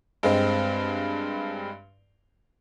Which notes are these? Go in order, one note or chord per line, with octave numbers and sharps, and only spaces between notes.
G2 G#3 C4